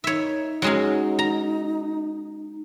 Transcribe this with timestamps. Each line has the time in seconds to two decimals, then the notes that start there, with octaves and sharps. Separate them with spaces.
0.04 D#4 C#5 E5
0.62 F#3 G#3 C#4
1.19 A#5